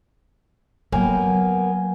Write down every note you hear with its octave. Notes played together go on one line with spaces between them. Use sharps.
F#3 A#3 B3 G5 G#5